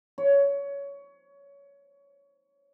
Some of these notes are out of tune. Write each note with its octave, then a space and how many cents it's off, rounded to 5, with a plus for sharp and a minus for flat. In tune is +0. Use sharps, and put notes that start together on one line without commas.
C#5 +20